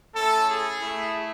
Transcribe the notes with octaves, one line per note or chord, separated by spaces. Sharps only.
A3 C#4 E4 A4
G#4
A3 E4